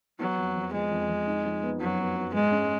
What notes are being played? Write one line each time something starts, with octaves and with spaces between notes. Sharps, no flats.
F#3 B3
F2
F2
F3 G#3
F2
F2
D#4
F3
B3
F#2 F#3
B3
B3
G#2 G#3
C#4